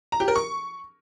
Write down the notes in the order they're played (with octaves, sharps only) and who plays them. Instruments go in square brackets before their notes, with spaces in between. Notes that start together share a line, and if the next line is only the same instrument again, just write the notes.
[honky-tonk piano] A#5
G4
A#4
C#6